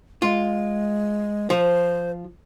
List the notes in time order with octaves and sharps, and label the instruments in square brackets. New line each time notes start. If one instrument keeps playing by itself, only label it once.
[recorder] G#3 [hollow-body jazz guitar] F4
[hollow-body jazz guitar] F3 [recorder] C5